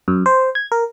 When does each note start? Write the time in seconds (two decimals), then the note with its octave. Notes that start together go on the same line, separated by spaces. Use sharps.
0.08 F#2
0.26 C5
0.55 G#6
0.72 A#4